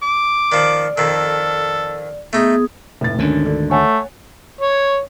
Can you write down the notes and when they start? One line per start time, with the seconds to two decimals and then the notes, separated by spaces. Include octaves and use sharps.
0.02 D6
0.52 D#3 F3 D5
0.98 F2 D#3 A4
2.33 A3 B3 D#4 G#4 D#6
3.01 F1 A2 A6
3.19 D2 G#2 D3 D#3 C#4
3.45 D4 A4
3.71 A3 C#5 F#5 G#5
4.61 C#5